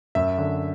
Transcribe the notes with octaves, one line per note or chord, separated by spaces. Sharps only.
F#2 E5
D3